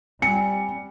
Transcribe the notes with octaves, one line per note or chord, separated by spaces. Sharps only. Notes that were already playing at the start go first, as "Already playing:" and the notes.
G3 C4 G#5 C#7